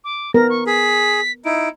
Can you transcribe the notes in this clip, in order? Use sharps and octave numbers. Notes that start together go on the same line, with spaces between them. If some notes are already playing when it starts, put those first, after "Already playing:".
D6
B3 A#4 A#6
C#6
G#4 B6
D#4 E4 D7